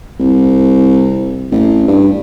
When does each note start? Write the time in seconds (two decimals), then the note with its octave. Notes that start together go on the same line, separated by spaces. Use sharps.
0.19 C2
1.51 A1
1.88 G2